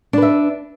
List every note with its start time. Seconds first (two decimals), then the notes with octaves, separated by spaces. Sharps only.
0.13 D4
0.18 B4
0.22 E5